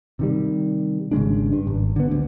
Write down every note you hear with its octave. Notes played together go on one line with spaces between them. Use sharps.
C3 D#3 G3
G#1 C#3 G#3 D4
G2
G#1
D3 B3
D2